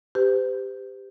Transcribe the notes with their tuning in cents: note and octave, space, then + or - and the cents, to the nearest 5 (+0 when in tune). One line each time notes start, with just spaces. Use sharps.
G4 +15 C5 -45